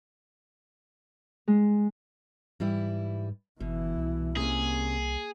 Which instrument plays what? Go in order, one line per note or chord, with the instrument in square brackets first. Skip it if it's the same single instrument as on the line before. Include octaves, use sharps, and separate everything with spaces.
[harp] G#3
[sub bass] G#2 [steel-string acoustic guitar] E3 G3 E4
[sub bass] G1 [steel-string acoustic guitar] B2 [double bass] E3 E4
[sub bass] C2
[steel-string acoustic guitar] C3 C#4 [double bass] A#3 [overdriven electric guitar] G#4